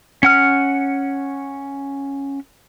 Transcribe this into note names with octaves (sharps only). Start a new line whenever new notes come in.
C#4 F#5 F6